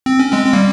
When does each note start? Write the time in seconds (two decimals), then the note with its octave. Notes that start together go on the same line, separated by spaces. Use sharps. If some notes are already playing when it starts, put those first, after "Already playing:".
0.06 C4
0.19 C#4
0.33 G#3 C4
0.46 C4
0.53 G3 A#3